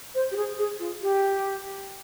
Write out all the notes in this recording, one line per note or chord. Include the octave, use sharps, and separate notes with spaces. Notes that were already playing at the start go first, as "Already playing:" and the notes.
C5
G4
G#4
G#4
F4
G4